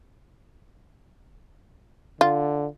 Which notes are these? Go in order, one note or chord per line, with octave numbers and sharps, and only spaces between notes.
D3 F4